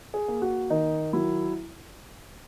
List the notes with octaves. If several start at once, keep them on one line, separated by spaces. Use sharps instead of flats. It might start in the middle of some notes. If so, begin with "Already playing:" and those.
G#4
A#3
F#4
D#3 D#4
F#3 E4